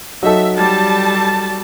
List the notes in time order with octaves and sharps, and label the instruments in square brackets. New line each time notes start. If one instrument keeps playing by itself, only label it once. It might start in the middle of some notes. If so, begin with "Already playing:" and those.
[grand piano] F#3 D#4 A4 [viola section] E5
[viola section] G3 A5